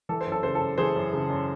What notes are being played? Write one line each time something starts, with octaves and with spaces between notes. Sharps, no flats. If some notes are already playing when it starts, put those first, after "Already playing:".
E3 A4
C5
F#2
A4
C#3 C5
A4
F#2
E3 G#4 C5
F#2
C#3
F#2